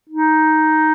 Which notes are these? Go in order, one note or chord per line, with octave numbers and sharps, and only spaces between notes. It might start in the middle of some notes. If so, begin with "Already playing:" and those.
D#4